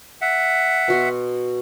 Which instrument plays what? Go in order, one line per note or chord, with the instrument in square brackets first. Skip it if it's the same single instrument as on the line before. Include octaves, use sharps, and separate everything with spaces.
[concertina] E5 F#5
[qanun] B2 F#4 C6